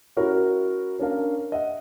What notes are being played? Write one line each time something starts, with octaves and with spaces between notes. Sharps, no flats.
C#4 E4 F#4 A#4 C#5
C#4 D4 A#4 F5
D#5 E5 F#5